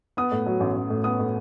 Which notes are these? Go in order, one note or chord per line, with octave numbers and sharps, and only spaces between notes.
B3 D#6
A2
F#3
A1
A1
A2
B3 D#6
A2